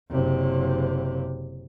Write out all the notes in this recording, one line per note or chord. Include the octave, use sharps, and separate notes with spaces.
F#1 C3